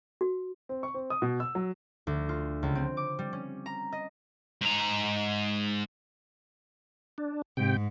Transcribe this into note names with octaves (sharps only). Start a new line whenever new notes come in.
F#4
C4
C#6
C4
D#6
B2
E6
F#3
D2
F4
C#2
C4
D6
G3
C#4
A#5
D#5
G#2 A#5
D4
G#2 C3 G5